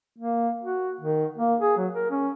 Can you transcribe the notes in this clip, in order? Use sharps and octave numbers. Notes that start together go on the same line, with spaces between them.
A#3
F#4
D#3
A#3
G#4
F#3
A#4
C#4